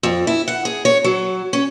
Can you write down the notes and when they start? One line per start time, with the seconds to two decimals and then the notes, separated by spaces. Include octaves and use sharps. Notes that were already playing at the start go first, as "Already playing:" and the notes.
0.03 F2
0.27 E4
0.48 F#5
0.65 G#4
0.85 C#5
1.04 F#3
1.53 C#4